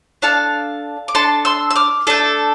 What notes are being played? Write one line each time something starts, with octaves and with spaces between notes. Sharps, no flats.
D4 A4 F5 A5
D6
D4 A4 A5 C6
C6 E6
E6
D6 F6
A3 D4 A4